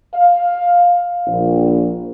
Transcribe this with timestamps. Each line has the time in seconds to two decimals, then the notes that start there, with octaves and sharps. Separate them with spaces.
0.14 F5
1.26 A#1